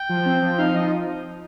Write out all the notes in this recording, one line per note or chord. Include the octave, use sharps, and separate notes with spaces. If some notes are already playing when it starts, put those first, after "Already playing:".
Already playing: G5
F3
C4
F3
D#4 F5
F3 D#5